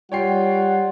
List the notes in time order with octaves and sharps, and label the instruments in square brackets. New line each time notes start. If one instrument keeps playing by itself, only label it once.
[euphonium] G3 [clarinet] F4 [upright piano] C#5 G5 C7 [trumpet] F#5